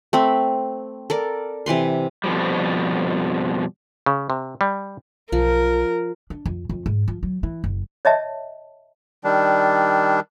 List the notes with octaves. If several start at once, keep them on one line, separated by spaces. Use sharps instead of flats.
A3 C4 B5
A4 A#4 D5
C3 E3 B4 C6
F2 G#2 B2 F3 G3
C#3
C3
G3
B1 F3 A#4
D4
F2
F2
G#2
F3
F#3
E3
F#1
C#5 D#5 E5 A5
D#3 G3 D4